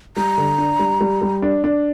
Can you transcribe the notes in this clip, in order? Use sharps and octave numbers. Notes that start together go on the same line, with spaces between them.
G3 A#5
D3
D4
G3
G3
G3
D4
D4